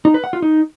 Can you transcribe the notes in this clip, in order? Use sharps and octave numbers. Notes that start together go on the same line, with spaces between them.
D#4
B4
F#5
F4
D#4